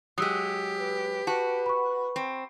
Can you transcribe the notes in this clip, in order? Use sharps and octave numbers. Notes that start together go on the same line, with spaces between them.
F#3 G#3 G4 D#6 E6
B4
F#4 B4 A5
B5 C#6
C4